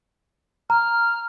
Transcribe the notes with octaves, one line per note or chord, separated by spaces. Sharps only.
A#5 F6